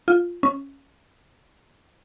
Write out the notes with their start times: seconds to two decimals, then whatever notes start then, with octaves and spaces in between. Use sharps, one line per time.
0.08 F4
0.43 C#4